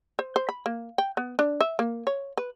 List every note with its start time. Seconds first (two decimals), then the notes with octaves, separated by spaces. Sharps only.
0.19 C5
0.36 C5
0.49 B5
0.66 A#3
0.98 G5
1.17 B3
1.39 D4
1.61 E5
1.79 A#3
2.07 C#5
2.37 B4